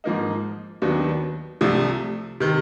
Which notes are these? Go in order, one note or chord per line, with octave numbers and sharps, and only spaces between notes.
G#2 F3 A#3 D#4
D#2 D#3 F#3 B3 D4
C2 C3 F3 A3
C3 D#3